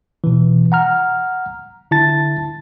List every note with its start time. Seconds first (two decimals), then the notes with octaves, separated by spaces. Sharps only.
0.24 B2 E3
0.72 F#5 A#5 F6
1.91 D3 E4 A5 A6